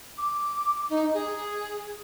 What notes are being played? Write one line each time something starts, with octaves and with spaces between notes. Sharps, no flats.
D6
D#4
G#4